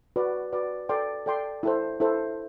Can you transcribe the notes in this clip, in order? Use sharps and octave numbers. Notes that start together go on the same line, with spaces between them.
F#4 B4 D5
F#4 B4 D5
A4 D5 G5 C6
A4 D5 G5 C6
E4 A4 C5
E4 A4 C5